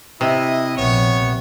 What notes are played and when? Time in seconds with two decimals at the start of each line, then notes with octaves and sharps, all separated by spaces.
0.21 C3 E4 D#5
0.77 A#1 B3 C#5